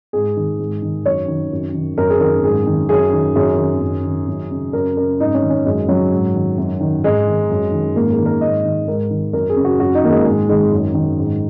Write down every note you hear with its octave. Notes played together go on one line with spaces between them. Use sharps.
G#2 G#4
D#3
G#2
D#3
F#2 C#5
D#3
F#2
D#3
F#2 A#4
G#4
D#3 A#4
G#2 G#4
D#3
F#2 G#4
D#3
F#2 G#4
D#3
F#2
D#3
F#2
C#3
F#2 A#4
C#3 A#4
G#2 D#4
C#4
D#3
C#4
F#2 G#3
C#3 F#3
G#2
D#3
F#2
D#3
G#2 G#3
D#3
F#2
D#3
G#2 A#3
G#4
D#3
A#4
G#2 D#5
D#3
G#2 A#4
D#3
F#2 A#4
G#4
C#3
F#4
F#2 F#4
D#4
D#3 A#3
G#3
G#2 G#3
D#3 G#3
F#2
D#3
G#2